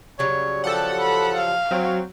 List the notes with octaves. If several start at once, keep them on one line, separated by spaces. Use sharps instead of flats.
C#3 F#3 G3 C#5
F3 G4 A4 F#5
B5
F5
F#3 C4